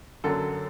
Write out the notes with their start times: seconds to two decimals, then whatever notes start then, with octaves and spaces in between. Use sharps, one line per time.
0.24 F#2 D3 F#3 A4